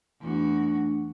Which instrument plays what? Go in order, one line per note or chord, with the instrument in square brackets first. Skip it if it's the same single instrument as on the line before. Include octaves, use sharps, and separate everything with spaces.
[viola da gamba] E2 F#4 [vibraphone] A3 D4